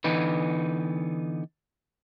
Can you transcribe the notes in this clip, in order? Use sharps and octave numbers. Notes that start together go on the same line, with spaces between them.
D3 E3 B3 D#4 B4